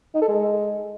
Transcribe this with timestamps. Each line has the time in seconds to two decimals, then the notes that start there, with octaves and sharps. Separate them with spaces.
0.15 D#4
0.22 A4
0.29 G#3